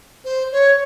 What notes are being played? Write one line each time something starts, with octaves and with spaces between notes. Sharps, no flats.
C5
C#5